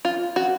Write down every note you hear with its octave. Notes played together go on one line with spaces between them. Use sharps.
F4
F#4